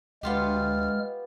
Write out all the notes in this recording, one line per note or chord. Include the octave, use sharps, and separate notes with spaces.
D2 G#3 B3 F4 G4 F6